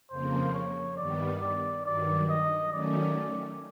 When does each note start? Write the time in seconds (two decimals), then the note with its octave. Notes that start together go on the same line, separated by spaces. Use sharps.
0.10 F2 C#3 F3 A#3 C5
0.54 C#5
0.97 G2 D#3 G3 B3 D5
1.42 D5
1.85 G2 D#3 F#3 D5
2.30 D#5
2.72 D#3 F#3 A3 C#4 D5